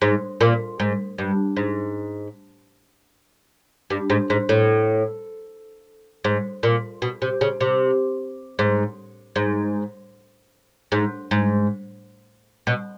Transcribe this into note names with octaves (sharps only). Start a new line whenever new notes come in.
G#2
A#2
G#2
G2
G#2
G2
G#2
G#2
A2
G#2
A#2
B2
C3
C#3
C3
G#2
G#2
G#2
G#2
B2